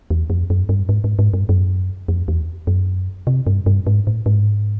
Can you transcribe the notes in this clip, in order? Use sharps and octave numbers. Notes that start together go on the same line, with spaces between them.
E2
F2
F#2
G2
G#2
G#2
G#2
G2
F#2
F2
E2
F#2
C3
G2
G2
G#2
A2
G#2